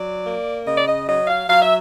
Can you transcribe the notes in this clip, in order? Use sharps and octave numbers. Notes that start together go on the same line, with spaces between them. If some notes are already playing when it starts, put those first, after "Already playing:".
Already playing: F#3 D5
A#3
C#3 D#5
D5
D#5
F#3 D#5
F5
F#3 F5
E5